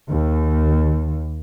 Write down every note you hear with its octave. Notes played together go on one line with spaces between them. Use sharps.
D#2